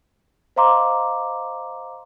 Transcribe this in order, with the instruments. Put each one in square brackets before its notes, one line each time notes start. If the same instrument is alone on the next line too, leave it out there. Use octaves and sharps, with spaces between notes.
[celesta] C5 D#5 F5 A#5 C6 D6